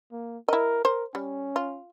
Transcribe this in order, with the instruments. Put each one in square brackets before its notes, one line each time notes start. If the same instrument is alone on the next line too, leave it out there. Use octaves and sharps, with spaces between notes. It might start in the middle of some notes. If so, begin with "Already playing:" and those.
[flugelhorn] A#3
[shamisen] E4 D#5 [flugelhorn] A#4
[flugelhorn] A#4 [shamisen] C5
[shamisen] G3 [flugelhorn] C#4
[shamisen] F4